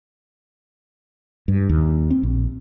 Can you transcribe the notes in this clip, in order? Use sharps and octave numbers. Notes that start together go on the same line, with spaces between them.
G2
D#2
C4
A#1